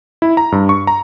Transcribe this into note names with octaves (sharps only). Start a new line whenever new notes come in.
E4
A#5
G2
C#6
A#5